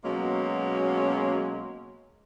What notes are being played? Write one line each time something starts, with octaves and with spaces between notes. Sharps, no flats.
B2 F#3 G#3 A#3 C#4